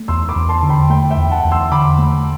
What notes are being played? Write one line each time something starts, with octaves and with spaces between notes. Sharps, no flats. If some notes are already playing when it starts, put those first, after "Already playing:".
Already playing: A3
E2 C6 E6
B5 D6
E2
A5 C6
D3
G5 B5
A3 G5 B5
E5 G5
E2
F#5 A5
E2
C6 E6
D3 B5 D6
A3